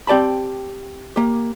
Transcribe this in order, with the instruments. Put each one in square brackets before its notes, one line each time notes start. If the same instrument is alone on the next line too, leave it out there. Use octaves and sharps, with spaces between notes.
[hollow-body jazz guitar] C4 G4 D5 A5 B5
A#3 G4